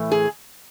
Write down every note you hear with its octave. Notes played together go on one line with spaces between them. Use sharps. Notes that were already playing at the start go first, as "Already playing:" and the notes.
Already playing: A2 E3 A3
G#4